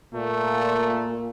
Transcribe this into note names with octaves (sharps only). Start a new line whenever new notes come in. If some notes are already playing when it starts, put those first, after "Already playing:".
A#2 A3